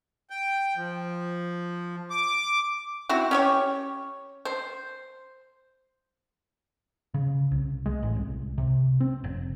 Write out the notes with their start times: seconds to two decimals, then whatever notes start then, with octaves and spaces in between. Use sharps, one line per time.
0.30 G5
0.76 F3
2.10 D6
3.09 C4 E4 F#4
3.31 C#4 G4 C#5
4.45 C5
7.14 C#3
7.51 C2
7.86 G#3
8.03 A1
8.15 C2
8.58 C3
9.00 C4
9.24 F1